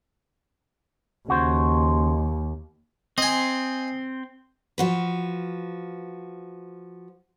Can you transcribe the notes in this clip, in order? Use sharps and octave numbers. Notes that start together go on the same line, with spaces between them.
D#2 C#3 F#4 C5
C4 D#5 G#5
F3 F#4 B4